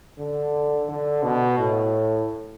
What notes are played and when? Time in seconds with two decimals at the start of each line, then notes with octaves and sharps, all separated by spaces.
0.18 D3
0.89 D3
1.23 B2
1.58 A2